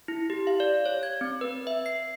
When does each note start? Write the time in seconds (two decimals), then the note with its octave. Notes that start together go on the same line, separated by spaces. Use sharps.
0.08 E4
0.30 G4
0.47 F5
0.60 D5
0.86 C#5
1.03 G#6
1.21 C4
1.41 B4
1.67 E5
1.86 C7